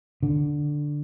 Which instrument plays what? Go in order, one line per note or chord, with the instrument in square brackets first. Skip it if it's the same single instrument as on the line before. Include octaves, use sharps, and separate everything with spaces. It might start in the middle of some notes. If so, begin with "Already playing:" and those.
[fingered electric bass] D3